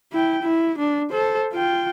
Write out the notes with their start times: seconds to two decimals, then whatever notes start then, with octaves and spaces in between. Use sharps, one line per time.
0.13 E4 G5
0.43 E4
0.79 D4
1.11 A4 C5
1.53 F4 G5